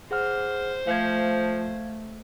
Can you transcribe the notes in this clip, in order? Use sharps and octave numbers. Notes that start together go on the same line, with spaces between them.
G#4 C5 F#5 F6
F3 A3 F5 G#6